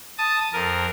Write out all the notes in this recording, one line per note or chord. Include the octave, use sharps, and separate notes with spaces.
A5 D#6
F2 A#4